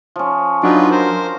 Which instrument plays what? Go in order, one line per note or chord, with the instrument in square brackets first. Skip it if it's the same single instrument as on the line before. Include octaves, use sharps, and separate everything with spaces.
[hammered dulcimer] F3 C#4
[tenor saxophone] F#3 [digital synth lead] D4 [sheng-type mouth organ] D#4 F4 B4
[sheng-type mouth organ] A#4 C5